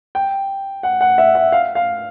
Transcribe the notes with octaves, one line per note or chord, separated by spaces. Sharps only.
G5
F#5
F#5
E5
E5
F5
F5